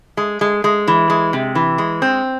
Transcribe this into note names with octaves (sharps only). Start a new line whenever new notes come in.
G#3
G#3
G#3
E3
G#3
C3
E3
G#3
C4